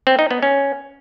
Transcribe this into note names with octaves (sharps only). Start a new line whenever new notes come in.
C4
D#4
B3
C#4